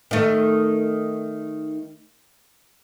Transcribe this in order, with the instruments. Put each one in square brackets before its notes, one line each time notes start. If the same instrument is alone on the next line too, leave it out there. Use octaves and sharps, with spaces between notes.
[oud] D#3 A3